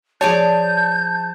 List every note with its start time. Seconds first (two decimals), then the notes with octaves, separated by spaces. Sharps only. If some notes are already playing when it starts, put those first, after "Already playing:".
0.21 F3 G#4 C#5 D5 G#5 A5 G6